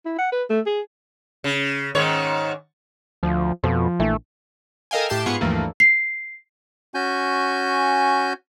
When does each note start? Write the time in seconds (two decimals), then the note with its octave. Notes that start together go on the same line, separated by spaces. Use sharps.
0.06 E4
0.19 F#5
0.32 B4
0.50 A3
0.66 G#4
1.44 C#3
1.95 G#2 D#3 C#5
3.23 D2 F3
3.64 F2 B2 F3
4.00 A#1 E3 A3
4.91 A4 A#4 D#5 F5 G5 G#5
5.09 A2 G4 A5 G6 C7 E7
5.26 G#2 B3 F4 G#4 F#5 C#6
5.41 D2 G2 E3 F3 A3 A#3
5.80 C7
6.94 C#4 F#4 G#5 G6